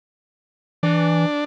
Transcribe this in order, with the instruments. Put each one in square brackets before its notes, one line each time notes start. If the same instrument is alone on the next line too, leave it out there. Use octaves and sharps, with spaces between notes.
[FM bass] E3 [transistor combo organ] D4